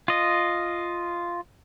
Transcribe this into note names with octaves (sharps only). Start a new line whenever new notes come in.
F4 D#5